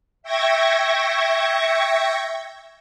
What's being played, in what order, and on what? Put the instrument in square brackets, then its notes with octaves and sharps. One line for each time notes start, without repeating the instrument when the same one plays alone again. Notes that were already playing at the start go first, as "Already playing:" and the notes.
[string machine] E5 G5 C#6 G#6 A#6